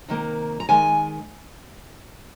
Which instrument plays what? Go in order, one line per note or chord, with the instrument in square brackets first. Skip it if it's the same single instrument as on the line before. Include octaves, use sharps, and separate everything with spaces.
[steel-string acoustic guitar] C3 D#3 A#3
A#5
D#3 G#3 G#5